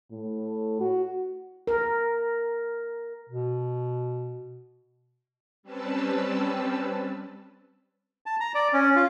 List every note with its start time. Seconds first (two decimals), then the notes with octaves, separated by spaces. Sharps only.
0.11 A2
0.80 F#4
1.67 A#4
3.28 B2
5.63 G3 C4 C#4 B4 A5 E6
8.26 A5
8.40 A#5
8.55 D5
8.73 C#4
8.96 F4